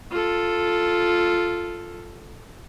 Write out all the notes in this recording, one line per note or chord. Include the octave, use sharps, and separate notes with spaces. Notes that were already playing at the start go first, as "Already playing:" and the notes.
F4 A4